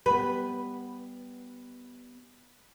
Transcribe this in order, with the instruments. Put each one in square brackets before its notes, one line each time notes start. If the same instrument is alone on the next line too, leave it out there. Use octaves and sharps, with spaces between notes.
[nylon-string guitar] G3 B3 [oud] B4